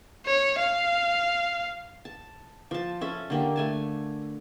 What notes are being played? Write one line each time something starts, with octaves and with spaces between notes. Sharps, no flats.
C#5
F5
A5
F3 A5
C#4 A4 E5
D3 A#3 G4
A3 G#5 A5